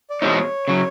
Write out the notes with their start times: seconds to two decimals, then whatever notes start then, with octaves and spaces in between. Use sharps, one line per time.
0.10 D5
0.22 E2 B2 G#3 C4 D#4 C#5
0.68 C#3 F#3